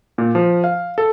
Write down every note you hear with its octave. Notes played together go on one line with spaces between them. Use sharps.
A#2
F3
F5
A4